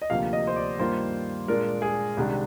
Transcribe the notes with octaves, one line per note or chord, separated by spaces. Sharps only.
D#5
D2 C3 F3 A#3 F5
D#5
C5
D5
G2 D#3 A#3 F4 C5
A#2 G#3 D4 F4 A#4
G#4
C2 C3 D#3 G#3 D4